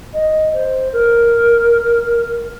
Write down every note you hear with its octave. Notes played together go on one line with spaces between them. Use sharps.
D#5
C5
A#4